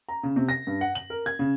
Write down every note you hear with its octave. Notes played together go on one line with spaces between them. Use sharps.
A#5
C#3
C3
A#6
G2
F#5
F#7
A#4
G#6
C#3